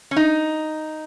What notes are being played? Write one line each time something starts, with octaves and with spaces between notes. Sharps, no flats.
C#4
D#4